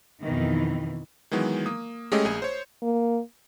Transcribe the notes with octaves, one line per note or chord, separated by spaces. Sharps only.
F2 B2 D#3 E3
D#3 E3 F#3 G#3 B3
A#3 D#6
G#3 A3 C#4 G4 G#4 D#5
A#1 G#4
C5 C#5
A#3